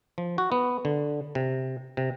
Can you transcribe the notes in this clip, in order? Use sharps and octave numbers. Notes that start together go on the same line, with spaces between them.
F3
F#4
B3
D3
C3
C3